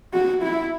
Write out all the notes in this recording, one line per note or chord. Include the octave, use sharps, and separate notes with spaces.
F#4
E4